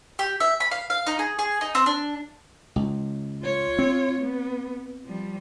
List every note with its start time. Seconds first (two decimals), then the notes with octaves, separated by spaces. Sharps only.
0.19 G4
0.40 E5
0.60 B5
0.71 F5
0.90 F5
1.07 D#4
1.19 G#4
1.39 G#4
1.61 D#4
1.75 C4
1.86 D4
2.76 C#2
3.42 F4 C#5
3.79 C4
4.20 B3
5.05 F3 G3